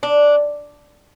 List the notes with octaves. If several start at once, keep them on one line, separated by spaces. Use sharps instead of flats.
D4